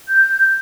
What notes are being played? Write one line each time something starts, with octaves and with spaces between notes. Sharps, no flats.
G6